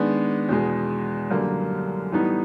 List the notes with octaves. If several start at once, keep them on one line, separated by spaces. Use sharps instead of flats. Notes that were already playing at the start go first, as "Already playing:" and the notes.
Already playing: D#3 G#3 B3 D4
E2 B2 G#3
F#2 D3 G3 A#3
A2 E3 G3 B3 D#4